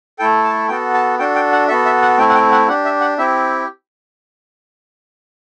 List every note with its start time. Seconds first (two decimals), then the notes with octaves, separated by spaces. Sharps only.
0.19 A3 E4 A4 G5
0.44 A5
0.69 B3 F#4 A4 G5
0.94 A5
1.19 D4 F#4 A4 G5
1.36 G5
1.52 F#5
1.68 B3 F#4 A4 E5
1.85 E5
2.02 F#5
2.18 A3 C4 E4 G5
2.29 F#5
2.35 G5
2.52 F#5
2.68 D4 G4 F#5
2.85 E5
3.01 F#5
3.18 C4 E4 G4 E5